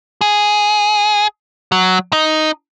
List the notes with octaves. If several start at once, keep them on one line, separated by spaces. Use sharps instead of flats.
G#4
F#3
D#4